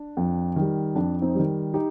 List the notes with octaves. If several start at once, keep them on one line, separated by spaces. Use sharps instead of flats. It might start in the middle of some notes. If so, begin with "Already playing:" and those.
Already playing: D4
F2
D#3
G3
F2 D4
C4 D#4
D#3 G3
D#4 G4